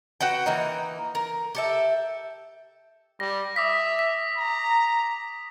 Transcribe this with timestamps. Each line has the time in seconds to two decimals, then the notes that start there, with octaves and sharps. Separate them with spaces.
0.21 F#4 B4 F#5 G5
0.46 E3 A#3 D#4
1.15 A#4
1.55 G4 A4 E5
3.20 G3 A#6
3.56 E5 D6 D#6 B6
3.99 B6
4.37 A#5